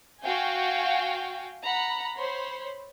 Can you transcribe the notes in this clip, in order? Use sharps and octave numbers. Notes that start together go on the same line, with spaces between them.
F#4 F5 G5 G#5
F#5 A#5 B5
C5 C#5 B5 C6